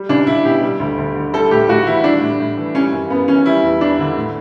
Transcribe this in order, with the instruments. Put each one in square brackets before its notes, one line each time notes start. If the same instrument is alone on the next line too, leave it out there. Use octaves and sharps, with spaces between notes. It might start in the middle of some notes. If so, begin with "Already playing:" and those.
Already playing: [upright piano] G3
C#2 D4
C#2 E4
B2 G4
G3
D2
D2
D3
G3 A4
A2 G4
A2 F#4
E3 E4
G3 D4
A2
A2
E3
G3 C#4
F#2
F#2 B3
E3 C#4
G3 E4
E2
E2 D4
D3
A2